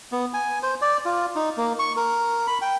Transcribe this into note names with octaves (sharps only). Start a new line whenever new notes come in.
B3
G#5
C5
D5
F4
D#4
A#3
C#6
A#4
B5
G5